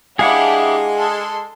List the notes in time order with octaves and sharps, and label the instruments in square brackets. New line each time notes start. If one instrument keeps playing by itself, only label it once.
[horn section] G#3 [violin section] D4 E4 G4 [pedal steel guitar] G#4 F5 F#5
[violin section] A4 C6